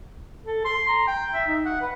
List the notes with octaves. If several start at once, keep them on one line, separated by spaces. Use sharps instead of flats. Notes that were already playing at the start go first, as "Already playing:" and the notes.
A4
C6
A#5
G5
E5
D#4
F#5
B4